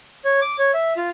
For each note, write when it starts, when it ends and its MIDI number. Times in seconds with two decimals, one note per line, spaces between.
0.25 0.40 73
0.41 0.56 86
0.59 0.71 73
0.74 0.93 76
0.97 1.10 65